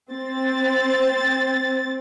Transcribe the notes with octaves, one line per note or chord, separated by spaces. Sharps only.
C4 A6